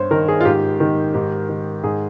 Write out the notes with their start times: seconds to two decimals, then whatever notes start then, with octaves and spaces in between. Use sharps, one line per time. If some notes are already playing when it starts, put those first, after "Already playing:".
Already playing: G2 C5 C#5
0.11 D#3 A#4
0.28 G#4
0.41 F4
0.45 G#2 G4
0.80 D#3
1.14 G#2 G4
1.49 D#3
1.83 G#2 G#4